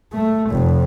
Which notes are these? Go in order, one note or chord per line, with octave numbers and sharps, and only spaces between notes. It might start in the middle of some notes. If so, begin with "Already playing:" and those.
A3
F1 F2